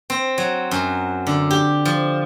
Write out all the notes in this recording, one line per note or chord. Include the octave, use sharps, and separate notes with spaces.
C4
F#3
F#2
D3
G4
F3